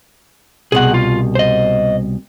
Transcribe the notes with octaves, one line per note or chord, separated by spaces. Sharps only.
C2 B2 G#4 F#5
F4
C5 D#5